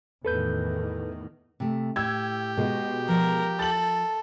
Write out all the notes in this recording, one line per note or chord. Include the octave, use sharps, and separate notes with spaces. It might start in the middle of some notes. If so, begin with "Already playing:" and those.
E2 A2 D#3 A4 B4 G6
C3 A3
A2 G4 E6 G#6
B2 G#3 F#4 D#5
F3 A#4
A4 A6 F#7